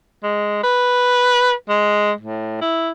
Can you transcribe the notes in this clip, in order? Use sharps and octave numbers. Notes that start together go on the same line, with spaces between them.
G#3
B4
G#3
A2
E4